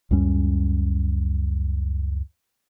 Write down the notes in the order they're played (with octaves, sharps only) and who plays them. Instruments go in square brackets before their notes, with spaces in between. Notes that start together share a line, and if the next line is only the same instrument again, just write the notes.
[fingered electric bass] C#2 F#2 G3 C#4